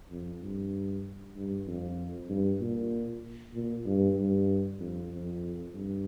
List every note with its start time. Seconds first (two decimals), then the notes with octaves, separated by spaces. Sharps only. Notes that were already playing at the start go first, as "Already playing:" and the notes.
0.11 F2
0.42 G2
1.36 G2
1.67 F2
2.30 G2
2.61 A#2
3.54 A#2
3.86 G2
4.17 G2
4.80 F2
5.11 F2
5.74 G2